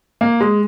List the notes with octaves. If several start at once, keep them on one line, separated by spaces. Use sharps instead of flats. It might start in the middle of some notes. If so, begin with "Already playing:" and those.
A#3
G#3